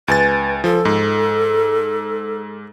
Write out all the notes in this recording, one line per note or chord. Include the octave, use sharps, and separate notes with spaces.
C#2 B4 G#5 A6
F3 A4
G#2